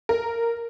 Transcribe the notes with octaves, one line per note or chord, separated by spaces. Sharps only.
A#4